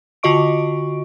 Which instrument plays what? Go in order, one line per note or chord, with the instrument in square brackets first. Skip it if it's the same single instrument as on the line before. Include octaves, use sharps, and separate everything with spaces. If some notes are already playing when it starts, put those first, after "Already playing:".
[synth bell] D3 F4 F#4 D#5 C#6 D7